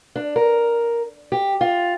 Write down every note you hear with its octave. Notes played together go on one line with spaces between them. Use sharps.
D4
A#4
G4
F4